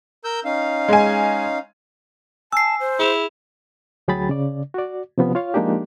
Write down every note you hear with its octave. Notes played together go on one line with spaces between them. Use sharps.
A#4 E6 G6
C#4 D#4 F5
G#3 G#5
G#5 A5 E6 C7
C5
E4 G#4 E7 F7
D2 F#3 G#4 G5 B5 A6
C#3 D5
F#4 D5
C3 F3 B3 C#4
F4 C#5 F5
F3 G#3 A#3 D4 D#4 G4